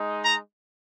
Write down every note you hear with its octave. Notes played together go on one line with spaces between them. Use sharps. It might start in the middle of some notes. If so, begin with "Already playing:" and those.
Already playing: G#3 D#4
A#5